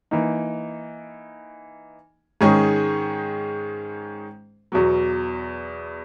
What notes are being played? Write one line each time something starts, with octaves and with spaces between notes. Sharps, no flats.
E3 A#3 D#4
G#2 D#3 G#3 C#4 G#4
E2 B2 F#3